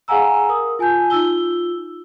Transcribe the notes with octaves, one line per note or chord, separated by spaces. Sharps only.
G#4 F5 F#5 G#5 A#5 E6
A#4 D#6
F4 G#5 A5 G6
D#4 F4 E6 G7